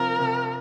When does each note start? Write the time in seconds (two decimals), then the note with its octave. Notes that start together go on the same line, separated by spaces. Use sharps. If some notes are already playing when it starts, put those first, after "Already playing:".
Already playing: C3 F3 C4 F4 A#4
0.19 C3